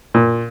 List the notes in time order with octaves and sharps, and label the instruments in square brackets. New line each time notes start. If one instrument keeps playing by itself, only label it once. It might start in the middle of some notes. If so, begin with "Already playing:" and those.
[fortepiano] A#2